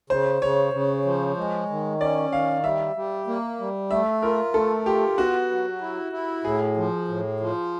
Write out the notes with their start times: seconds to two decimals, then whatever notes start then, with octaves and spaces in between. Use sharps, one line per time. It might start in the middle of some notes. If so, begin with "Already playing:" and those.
0.10 C#3 C5
0.42 C#3 C#5
0.73 C#3
1.05 F3
1.37 G#3
1.70 D#3
2.01 C#4 D5
2.32 D#3 F5
2.64 G3 E5
2.96 G3
3.27 A#3
3.60 G3
3.91 A3 E5
4.22 F4 A#4
4.54 A3 A4
4.86 F4 G4
5.18 B3 F#4
5.50 F#3
5.81 E4
6.12 E4
6.44 A2 G#4
6.77 F3
7.08 A2
7.40 F3